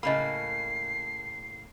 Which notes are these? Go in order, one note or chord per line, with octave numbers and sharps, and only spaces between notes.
A2 C#3 A#3 D#5 B5 C7